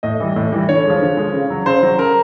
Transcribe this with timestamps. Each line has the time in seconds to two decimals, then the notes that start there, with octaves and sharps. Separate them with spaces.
0.03 A2 D#5
0.20 E3 G3
0.36 A2
0.52 E3 G3
0.69 D3 C#5
0.86 F3 G#3
1.02 D3
1.17 F3 G#3
1.33 C#3
1.50 F#3
1.66 C#3 C5
1.83 F#3
1.98 C#3 A#4